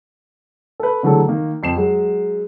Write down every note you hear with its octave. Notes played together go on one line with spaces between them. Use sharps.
A4 B4
D3 E3 F#3 G#3 A3 A4
D#3 A#3
F2 C7 E7
F#3 G#3